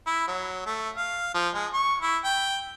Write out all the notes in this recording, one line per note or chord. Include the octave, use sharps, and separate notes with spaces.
E4
F#3
A3
F5
F3
G#3
C#6
E4
G5